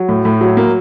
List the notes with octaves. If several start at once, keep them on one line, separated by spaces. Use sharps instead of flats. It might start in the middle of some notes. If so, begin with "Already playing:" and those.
Already playing: F#3
A2
A2
F#3
A#3